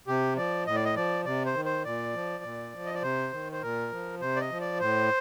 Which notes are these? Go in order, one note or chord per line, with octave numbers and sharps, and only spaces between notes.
C3 G4
F3 D5
A2 D#5
D5
D#5
F3 D5
C3 D5
C5
D#3
C5
A#2 D5
F3
A#2
F3
D#5
D5
C3 C5
D#3
C5
A#2 A#4
F3
C3 C5
D5
D#5
F3
D5
A2 C5